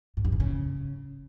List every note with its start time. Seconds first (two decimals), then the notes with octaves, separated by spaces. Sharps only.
0.17 G#2
0.25 G2
0.32 D3
0.40 C#3